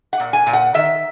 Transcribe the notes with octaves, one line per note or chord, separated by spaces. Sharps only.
F#5
A#2
G#5
A#2
F#5
D#3 E5